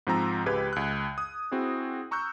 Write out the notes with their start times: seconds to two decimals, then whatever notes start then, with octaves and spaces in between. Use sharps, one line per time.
0.07 G#2 F3 C4 A#5 E6
0.46 C#2 G#3 G4 B4 G#6
0.73 C#2 F#6
1.18 D#6
1.52 C4 E4 F#4 G#4
2.11 A#5 C#6 E6 F#6 G6